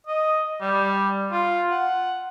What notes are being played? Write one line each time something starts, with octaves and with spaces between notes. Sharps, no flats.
D#5
G3
F4
F#5